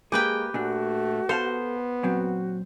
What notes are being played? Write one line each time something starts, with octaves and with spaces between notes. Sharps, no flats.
G#3 A#3 G4 G#4 B4 G5
A#2 A3 D4 F#4
B3 A4 C5 F5 A5
A#2 F#3 C4 F#4